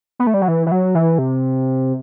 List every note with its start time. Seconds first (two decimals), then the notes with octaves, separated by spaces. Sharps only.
0.19 B3
0.27 A3
0.34 G3
0.42 F#3
0.48 E3
0.67 E3
0.72 F#3
0.95 E3
1.18 C3